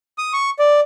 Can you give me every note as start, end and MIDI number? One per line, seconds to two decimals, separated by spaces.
0.18 0.33 87
0.33 0.50 85
0.59 0.80 74